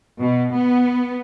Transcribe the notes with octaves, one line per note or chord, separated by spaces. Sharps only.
B2
B3